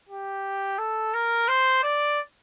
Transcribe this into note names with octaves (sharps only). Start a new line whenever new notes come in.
G4
A4
A#4
C5
D5